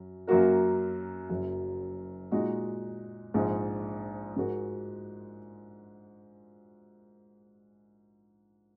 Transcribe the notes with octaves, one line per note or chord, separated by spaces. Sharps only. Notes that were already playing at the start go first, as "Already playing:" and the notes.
Already playing: F#2 F#3
F#2 F#3 A#3 F#4 A#4
F#1 F#2 F#3
A#2 G#3 D#4 F#4
A#1 G#2 G#3
G#2 G#3 F#4 A#4